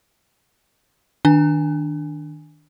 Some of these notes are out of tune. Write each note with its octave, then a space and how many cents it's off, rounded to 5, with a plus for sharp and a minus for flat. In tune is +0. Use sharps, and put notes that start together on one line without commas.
D#3 +0 D4 +0 G#5 +0